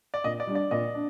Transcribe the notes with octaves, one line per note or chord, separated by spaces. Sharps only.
D5
A#2 D#5
D5
G3 D4
D5
A#2 D#5
D4